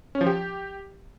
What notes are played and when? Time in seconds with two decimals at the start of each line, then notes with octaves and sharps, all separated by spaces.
0.15 C#4
0.21 F3
0.27 G4